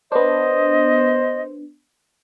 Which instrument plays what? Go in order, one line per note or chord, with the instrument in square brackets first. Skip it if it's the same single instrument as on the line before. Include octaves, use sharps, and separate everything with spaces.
[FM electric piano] B3 D4 [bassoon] C5 [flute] D#5